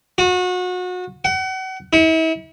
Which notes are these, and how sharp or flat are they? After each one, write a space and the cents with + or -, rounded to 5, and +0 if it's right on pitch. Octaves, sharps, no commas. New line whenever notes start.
F#4 -30
F#5 +35
E4 -40